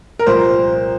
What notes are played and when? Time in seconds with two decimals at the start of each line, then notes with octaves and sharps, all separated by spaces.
0.19 A#4
0.26 C2 A#2 F3 C5